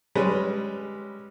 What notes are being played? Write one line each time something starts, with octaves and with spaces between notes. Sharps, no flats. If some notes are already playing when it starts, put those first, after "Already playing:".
G3 G#3 C#4 B4